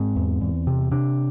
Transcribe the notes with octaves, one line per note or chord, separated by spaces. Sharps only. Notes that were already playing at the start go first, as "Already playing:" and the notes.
Already playing: G#2 C4
E2
E2
C3
C3 D4